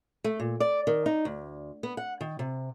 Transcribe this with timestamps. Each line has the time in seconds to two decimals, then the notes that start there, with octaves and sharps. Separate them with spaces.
0.24 A3
0.40 A#2
0.60 D5
0.87 D#3
1.06 D#4
1.25 D2
1.83 B3
1.97 F#5
2.21 D#3
2.39 C3